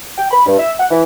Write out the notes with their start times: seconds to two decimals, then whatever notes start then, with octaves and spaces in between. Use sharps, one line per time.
0.18 G5
0.31 B5
0.46 G2
0.59 E5
0.79 F#5
0.91 E3